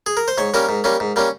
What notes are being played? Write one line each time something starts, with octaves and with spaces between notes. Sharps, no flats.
G#4
A#4
C5
G#2 C#5
G3 A#3 C#4 A#4
G#2
G3 A#3 C#4
G#2
G3 A#3 C#4